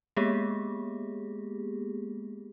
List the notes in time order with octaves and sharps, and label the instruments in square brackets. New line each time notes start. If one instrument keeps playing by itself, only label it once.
[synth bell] G#3 A#3 B3 G4 G#4